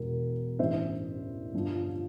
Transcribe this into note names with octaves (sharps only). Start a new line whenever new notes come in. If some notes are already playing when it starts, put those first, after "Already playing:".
Already playing: E1 E2 E3 A#4
A1 G2 E3 C5 E5
G1 G2 F3